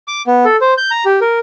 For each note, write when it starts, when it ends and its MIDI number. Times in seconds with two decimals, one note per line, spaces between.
0.08 0.22 86
0.27 0.45 59
0.45 0.56 69
0.61 0.74 72
0.78 0.91 91
0.91 1.04 82
1.05 1.19 67
1.21 1.39 70